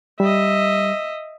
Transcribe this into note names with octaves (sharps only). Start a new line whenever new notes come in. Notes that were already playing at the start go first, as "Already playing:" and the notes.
G3 D#5 E5